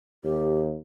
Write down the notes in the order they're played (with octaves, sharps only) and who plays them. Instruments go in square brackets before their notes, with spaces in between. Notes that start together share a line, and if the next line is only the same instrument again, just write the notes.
[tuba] D#2 [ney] G4